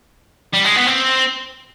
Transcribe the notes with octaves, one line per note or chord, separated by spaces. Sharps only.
G3
G#3
B3
C4